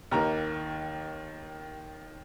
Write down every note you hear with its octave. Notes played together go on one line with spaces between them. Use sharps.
D#2 D#3 A#3 A#5